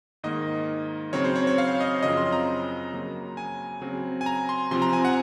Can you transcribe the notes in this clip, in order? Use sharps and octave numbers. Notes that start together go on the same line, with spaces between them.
G#2 D#3 A#3 D#5
C#3 F#3 C4 C#5
C5
C#5
C#5
F5
D#5
F#2 C#3 F3 C4 D#5
C6
A#5
C#3 F#3 A#3
G#5
C#3 F#3 C4
G#5
A#5
C6
C3 F3 C4 C6
A#5
G#5
F#5